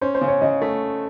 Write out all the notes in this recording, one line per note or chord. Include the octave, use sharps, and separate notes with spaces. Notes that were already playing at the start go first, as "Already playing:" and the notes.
C#4 C5
C5
C#3
C#5
C#3 D#5
A3